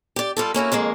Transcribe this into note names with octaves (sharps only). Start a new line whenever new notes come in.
G4 D5
G3 F4 A4
A#3 C#4 E4 F#4
F2 D#3 G#3 A#3